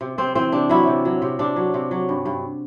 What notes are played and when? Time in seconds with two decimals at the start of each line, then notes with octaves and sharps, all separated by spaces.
0.01 C3
0.18 C3 C4
0.35 E3 C4
0.52 C3 D4
0.69 F#3 E4
0.87 C3
1.05 F#3
1.22 C3
1.39 C3 D4
1.56 F#3
1.74 C3
1.91 F#3
2.09 G2
2.25 G2